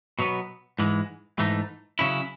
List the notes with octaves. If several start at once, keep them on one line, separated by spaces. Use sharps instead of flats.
B2 F#3 B3
G#2 E3 G#3
G#2 E3 A3 D#4
C#3 F#3 C#4 E4